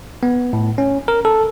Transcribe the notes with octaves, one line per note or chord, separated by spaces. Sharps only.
B3
A2
C#4
A#4
A4